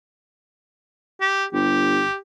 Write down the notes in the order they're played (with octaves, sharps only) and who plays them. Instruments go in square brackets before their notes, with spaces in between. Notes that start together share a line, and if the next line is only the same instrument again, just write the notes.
[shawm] G4
[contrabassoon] G1 [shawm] G4